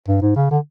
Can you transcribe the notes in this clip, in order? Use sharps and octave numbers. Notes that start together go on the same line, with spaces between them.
G2
G#2
C#3
D3